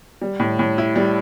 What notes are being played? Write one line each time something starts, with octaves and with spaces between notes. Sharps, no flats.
G3
A2
A2
E4
G3